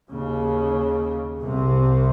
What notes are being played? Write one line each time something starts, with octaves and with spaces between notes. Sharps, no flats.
D#2 C#3
C2 C3